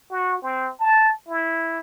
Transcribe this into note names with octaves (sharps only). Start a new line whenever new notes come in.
F#4
C4
A5
E4